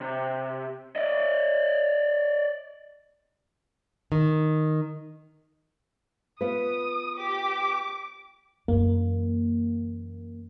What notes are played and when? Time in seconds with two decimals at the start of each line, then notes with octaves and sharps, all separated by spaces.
0.01 C3
0.96 D5 D#5
4.12 D#3
6.41 B3 F4 B4 D#6
7.18 G4 D6
8.68 F#2 E3 A#3